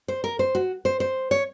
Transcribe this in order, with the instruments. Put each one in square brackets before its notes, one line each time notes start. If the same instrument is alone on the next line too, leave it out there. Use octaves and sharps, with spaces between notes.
[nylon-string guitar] C5
A#4
C5
F#4
C5
C5
C#5